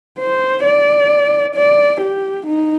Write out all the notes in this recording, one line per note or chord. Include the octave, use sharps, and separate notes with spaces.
C5
D5
D5
G4
D#4